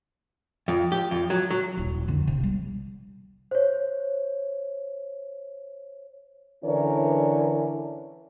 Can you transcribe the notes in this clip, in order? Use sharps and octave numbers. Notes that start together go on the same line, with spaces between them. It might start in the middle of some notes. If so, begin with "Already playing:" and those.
F2
G4
F2
F#3
F#3
D#1 E4
F2 D3
C3
G3 C4
C5 C#5
D3 E3 C#4 A#4 C#5 D5